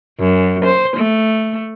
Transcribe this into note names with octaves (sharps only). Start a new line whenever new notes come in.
F#2
C5
A3